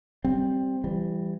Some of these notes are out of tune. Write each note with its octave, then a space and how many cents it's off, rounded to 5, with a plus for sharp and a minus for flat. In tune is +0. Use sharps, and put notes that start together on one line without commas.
G3 -5 C4 +5
E3 +35 G3 +0